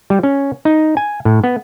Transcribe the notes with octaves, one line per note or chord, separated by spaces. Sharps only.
G3
C#4
D#4
G#5
A2
B3